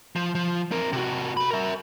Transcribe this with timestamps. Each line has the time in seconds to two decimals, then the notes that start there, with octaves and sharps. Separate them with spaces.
0.16 F3
0.35 F3
0.71 C4 A#4
0.93 C3 F#4
1.37 A4 B5
1.51 A#4 E5